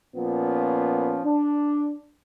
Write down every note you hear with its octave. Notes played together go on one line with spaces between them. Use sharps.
A#2 F3 B3 C#4
D4